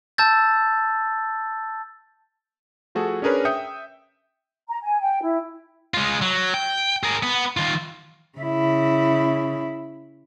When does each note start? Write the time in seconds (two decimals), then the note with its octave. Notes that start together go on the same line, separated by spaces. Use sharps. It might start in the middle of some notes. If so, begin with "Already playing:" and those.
0.18 A5 E6 G6 A6
2.95 F3 A3 F#4 G#4 A4
3.22 C#4 D4 G#4 A#4 B4 C#5
3.45 E5 G5 D#6 G6 C#7
4.68 A#5
4.83 G#5
5.02 G5
5.22 E4
5.94 G#3 F4
6.22 F#3
6.54 G5
7.03 G#4 A#4
7.23 B3
7.57 D#3 F4
8.38 C#3 E4